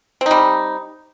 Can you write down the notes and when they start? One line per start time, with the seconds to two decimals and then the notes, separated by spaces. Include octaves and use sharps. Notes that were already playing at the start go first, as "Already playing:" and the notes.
0.21 C4
0.26 D#4
0.31 G3